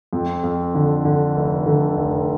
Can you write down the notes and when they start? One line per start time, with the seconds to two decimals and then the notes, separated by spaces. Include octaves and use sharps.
0.13 F2
0.44 F2
0.74 D3
1.05 D3
1.37 F1
1.66 D3
1.97 F1